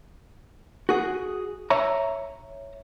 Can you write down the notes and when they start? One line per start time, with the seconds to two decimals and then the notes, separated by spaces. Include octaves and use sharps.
0.89 F#4 G#4
1.70 C#5 E5 A#5